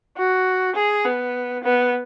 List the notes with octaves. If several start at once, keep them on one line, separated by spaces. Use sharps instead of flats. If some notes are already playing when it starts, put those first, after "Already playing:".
F#4
G#4
B3
B3